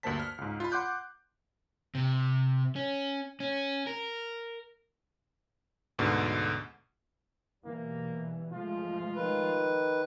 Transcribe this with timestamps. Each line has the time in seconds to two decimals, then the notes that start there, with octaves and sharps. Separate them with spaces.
0.03 D2 G2 A#3 C5 A5 B6
0.20 F6
0.38 C#2 G#2
0.60 F4 B5
0.72 F#5 C6 D6 F#6 G6
1.95 C3
2.76 C#4
3.40 C#4
3.87 A#4
5.98 D2 G#2 B2 D3
7.65 B2 E3 G3 A#3
8.53 F3 G#3 A3 F4
9.16 D#3 B4